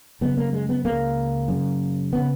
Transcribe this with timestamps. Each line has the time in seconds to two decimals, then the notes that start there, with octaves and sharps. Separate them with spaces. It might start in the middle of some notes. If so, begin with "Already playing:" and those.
0.21 F#2 C#3 B3
0.37 A#3
0.53 G#3
0.69 B3
0.85 C#2 C#3 A#3
1.48 F#2 C#3
2.13 C#3 B3